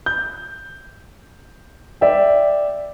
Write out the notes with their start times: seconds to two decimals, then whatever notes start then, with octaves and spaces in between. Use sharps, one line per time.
0.06 G6
2.01 D5 E5 G5